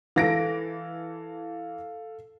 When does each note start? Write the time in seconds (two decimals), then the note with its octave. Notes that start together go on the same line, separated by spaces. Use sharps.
0.16 E3 A4 F5 A#6 D7